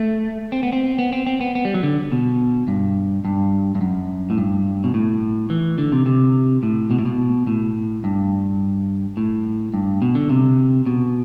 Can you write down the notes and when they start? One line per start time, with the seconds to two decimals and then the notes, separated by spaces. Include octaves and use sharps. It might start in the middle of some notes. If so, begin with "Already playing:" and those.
Already playing: A3
0.52 C4
0.63 B3
0.72 C4
0.99 B3
1.13 C4
1.27 C4
1.41 B3
1.55 B3
1.65 G3
1.74 F#3
1.83 D3
2.12 B2
2.68 G2
3.25 G2
3.75 G2
3.81 F#2
4.30 A2
4.38 G2
4.84 B2
4.94 A2
5.50 E3
5.78 D3
5.92 C3
6.06 C3
6.63 A2
6.91 B2
6.99 A2
7.05 B2
7.47 A2
8.04 G2
9.17 A2
9.74 G2
10.02 B2
10.15 D3
10.29 C3
10.86 B2